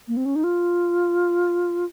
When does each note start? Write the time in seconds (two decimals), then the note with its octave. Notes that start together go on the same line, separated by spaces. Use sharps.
0.08 A#3
0.17 C4
0.25 C#4
0.36 D#4
0.44 F4